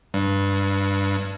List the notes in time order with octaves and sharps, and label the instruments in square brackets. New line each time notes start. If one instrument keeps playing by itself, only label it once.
[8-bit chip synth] G2